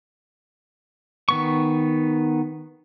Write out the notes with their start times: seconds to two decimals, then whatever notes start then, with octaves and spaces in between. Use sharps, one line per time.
1.29 D#3 B3 C#6